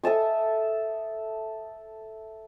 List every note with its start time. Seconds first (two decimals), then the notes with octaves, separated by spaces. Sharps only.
0.03 A4 E5 A5 D#6